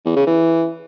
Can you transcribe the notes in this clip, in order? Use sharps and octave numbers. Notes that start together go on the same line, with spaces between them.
E2
C#3
E3